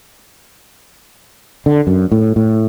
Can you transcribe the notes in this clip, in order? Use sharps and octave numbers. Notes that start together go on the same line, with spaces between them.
D3
F#2
A2
A2